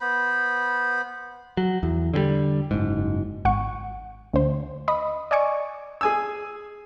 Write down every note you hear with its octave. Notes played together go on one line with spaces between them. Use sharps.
B3 C5 B5
F#3
E2
D3 D#3 G3
F#1 G#2
G#1 F#5 C#6
D2 C5
D#5 B5 D#6
D5 D#5 G#5 C#6 D6
G#4 G#5 E6